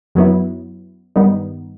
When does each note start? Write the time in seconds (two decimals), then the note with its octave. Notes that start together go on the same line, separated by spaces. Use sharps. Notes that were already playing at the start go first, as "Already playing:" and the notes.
0.15 F#2 F#3 B3 E4
1.16 G2 D#3 G3 B3 D#4